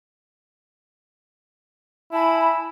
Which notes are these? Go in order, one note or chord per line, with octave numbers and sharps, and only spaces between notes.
E4 G#5 A5 B5